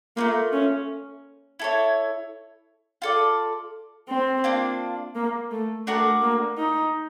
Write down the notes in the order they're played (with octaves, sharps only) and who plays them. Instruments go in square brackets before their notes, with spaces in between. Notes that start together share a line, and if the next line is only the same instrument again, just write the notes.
[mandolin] A3 D4 F4 [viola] A#3
[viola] C#4
[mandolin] E4 A4 C#5
F4 A4 D5
[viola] C4
[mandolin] A#3 D4 F4
[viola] A#3
A3
[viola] A3 [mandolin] D4 F#4 A#4 D5
[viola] A#3
D#4